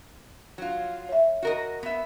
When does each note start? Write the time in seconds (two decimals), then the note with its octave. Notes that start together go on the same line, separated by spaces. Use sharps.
0.58 F#3 F4
1.09 C#5 E5
1.42 F#4 A#4 D#5
1.83 B3 E5